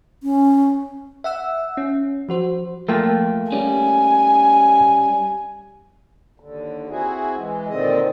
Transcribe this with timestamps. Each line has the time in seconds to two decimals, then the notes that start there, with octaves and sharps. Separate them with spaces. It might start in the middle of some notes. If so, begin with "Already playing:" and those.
0.23 C#4
1.24 E5 F#5 E6
1.77 C#4
2.29 F3 F#4 C5
2.89 F3 A3 A#3 F4 G5
3.52 G3 C#4 G#5
6.40 D#2 D3
6.89 C4 E4 F#4 G#4
7.36 E3 G#3
7.68 A#2 D3 D#3 C4 D#5